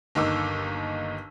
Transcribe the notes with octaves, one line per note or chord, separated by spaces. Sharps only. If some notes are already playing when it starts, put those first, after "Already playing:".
G1 D#2 D#4 D6 E6